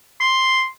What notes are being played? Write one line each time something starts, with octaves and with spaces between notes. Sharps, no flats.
C6